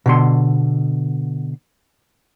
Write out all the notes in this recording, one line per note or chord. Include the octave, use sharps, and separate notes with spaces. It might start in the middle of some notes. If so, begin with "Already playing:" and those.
B2 D3 C6